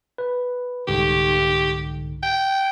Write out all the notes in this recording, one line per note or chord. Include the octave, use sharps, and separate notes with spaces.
B4
C2 G#2 D3 G4
G5